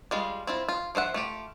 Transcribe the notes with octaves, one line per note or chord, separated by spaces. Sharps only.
G3 G#3 F4
C4 E4 F4
F4
F3 C5 E5 F#5
A3 F4 G4